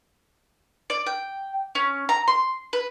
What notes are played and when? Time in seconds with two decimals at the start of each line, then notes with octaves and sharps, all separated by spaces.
0.90 D5
1.06 G5
1.75 C#4
2.09 A#5
2.28 C6
2.73 B4